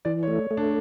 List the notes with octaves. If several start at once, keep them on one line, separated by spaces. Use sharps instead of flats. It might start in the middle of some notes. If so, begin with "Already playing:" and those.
E3 D5
C#5
A3
A3
D4